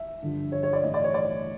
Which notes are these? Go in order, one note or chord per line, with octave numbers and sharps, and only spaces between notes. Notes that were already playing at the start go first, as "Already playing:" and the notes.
Already playing: E5
G2 D3 F3
C#5
C#5
D5
A2 E3 D#5
D5
C#5
D5